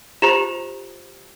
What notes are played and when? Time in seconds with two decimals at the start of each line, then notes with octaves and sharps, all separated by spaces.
0.22 F4 G4 C5 A#5 E7